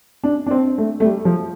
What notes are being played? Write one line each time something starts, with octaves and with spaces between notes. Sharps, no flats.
D4
D4
C4
A3
A3
G3
F3